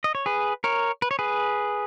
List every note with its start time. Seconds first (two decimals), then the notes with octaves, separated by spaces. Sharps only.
0.04 D#5
0.15 C#5
0.26 G#4 B4
0.64 A#4 C#5
1.02 B4
1.11 C#5
1.19 G#4 B4